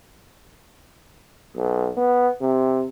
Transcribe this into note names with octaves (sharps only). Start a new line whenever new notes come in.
B1
B3
C3